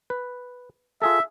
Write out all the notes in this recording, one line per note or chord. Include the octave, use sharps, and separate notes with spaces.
B4
F4 G#4 A4 E5